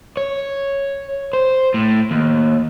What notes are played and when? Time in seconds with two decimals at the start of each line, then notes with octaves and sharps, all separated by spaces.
0.17 C#5
1.33 C5
1.74 A2
2.11 D#2